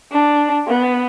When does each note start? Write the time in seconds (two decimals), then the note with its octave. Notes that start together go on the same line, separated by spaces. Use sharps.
0.12 D4
0.68 B3